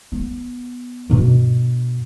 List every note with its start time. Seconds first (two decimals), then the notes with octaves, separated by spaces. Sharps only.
0.12 B3
1.10 G2 B2